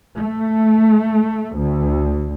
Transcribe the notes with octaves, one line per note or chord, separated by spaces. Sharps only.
A3
D2